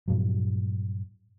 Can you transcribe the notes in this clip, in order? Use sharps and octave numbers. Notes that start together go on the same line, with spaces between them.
G2 A#2 F3 F#3